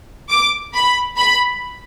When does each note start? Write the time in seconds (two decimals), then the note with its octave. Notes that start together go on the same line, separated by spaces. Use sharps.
0.29 D6
0.74 B5
1.17 B5